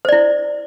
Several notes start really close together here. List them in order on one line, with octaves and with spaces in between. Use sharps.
C5 D5 E4